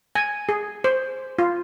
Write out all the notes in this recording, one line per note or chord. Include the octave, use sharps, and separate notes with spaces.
G#5
G#4
C5
F4